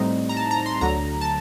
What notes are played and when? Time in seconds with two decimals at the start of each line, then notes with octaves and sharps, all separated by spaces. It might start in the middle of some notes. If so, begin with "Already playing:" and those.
Already playing: A2 G3 C4 D#4
0.29 A#5
0.37 A5
0.51 A#5
0.66 C6
0.81 D2 D3 F#3 A#5
1.21 A5